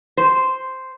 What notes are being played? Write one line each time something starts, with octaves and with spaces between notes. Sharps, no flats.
C5